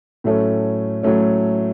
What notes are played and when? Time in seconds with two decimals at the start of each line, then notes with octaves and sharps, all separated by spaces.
0.24 A2 F#3 A3 C#4
1.03 A2 F#3 A3 C#4